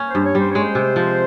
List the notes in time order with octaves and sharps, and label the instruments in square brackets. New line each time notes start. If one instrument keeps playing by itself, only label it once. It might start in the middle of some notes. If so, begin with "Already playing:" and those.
Already playing: [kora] A#3 C#4
[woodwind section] C5
[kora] G2
[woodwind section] C#5
[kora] G3 [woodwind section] C5
[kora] G#3 [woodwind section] C#5
[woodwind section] C5
[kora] C3
F3